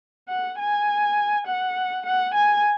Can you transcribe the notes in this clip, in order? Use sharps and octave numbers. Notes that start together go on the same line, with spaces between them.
F#5
G#5
F#5
F#5
G#5